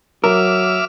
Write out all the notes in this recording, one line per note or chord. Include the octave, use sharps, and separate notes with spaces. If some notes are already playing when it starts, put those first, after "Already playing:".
F#3 A#4 E5 D6 F6